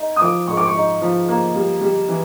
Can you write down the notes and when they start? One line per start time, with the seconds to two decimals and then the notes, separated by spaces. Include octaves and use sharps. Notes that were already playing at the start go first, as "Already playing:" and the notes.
Already playing: D#4
0.16 D#6
0.21 F3 D6
0.47 G#2 C#6
0.57 D6
0.65 C#6
0.75 D#4
1.02 F3
1.28 A#3
1.55 G3
1.81 G3
2.09 E3